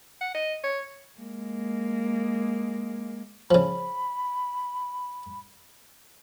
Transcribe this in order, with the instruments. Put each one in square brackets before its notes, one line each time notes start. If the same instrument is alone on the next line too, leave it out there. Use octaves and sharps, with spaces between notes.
[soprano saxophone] F#5
D#5
C#5
[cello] G#3 A#3
[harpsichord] C#3 F3 [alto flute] B5